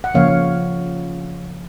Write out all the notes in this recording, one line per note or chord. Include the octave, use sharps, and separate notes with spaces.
F#5
C#3 F3 A#3 C#5 F5